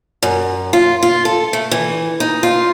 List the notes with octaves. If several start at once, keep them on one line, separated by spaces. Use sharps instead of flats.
F#2
F4
F4
A4
A3
E3
D#4
F4